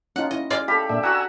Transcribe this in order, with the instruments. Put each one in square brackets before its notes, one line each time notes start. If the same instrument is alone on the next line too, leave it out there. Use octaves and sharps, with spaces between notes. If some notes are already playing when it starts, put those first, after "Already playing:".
[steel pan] C#4 D#4 F4 [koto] F#5
[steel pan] E4 [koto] D#5
[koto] G#3 F4 D5
[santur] G4 B5 [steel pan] A4 F5
[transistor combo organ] A#2 E5 [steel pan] D4
[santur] F#4 F#5 [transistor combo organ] G#5 A#5 E6